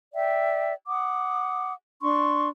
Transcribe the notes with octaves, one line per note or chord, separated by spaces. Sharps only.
D5 E5 G5
F#5 D6 D#6
D4 C6 C#6